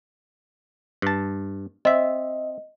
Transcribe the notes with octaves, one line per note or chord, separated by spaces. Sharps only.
G2 A5
C4 D#5 E5